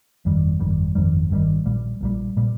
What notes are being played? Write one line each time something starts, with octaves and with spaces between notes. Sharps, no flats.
G1 F2 D#3 G3
G1 F2 D#3 G3
G1 F2 D#3 G3
G1 F2 D#3 G3
A#1 A#2 G3
A#1 A#2 G3
A#2 G3